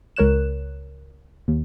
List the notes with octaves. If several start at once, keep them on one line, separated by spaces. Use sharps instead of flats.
C#2 A#4 C#5 F#6 E7
D#2